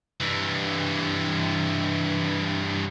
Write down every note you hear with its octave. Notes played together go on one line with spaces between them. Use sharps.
G2 E3